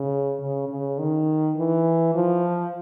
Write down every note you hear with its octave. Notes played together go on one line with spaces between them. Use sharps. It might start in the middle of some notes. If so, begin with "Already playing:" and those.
Already playing: C#3
C#3
C#3
D#3
E3
F3